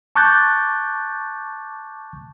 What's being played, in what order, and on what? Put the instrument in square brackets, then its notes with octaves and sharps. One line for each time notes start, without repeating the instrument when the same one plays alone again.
[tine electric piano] A5 C#6 D6 F#6 G6 A6